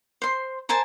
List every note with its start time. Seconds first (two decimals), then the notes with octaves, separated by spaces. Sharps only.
0.22 C5 C6
0.69 A#4 C5 G#5 A5